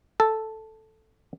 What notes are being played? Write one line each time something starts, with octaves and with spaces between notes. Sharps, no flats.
A4